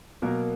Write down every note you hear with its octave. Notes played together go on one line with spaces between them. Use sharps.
B2 F#3 A#3 A#4